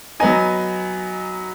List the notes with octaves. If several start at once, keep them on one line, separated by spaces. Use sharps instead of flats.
F#3 B3 D#4 G#5